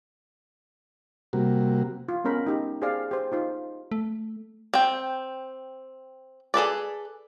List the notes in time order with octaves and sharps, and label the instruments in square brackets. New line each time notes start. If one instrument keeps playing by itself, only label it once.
[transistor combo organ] C3 G3 A#3 F#4
[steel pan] F4
G#3 B3 C#4 A#4 B5
D#4 G4
G4 G#4 C5 D5 F5
G4 C5
D#4 F4 C5
[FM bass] A3
[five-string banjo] C4 G5
G#4 A4 B4 D5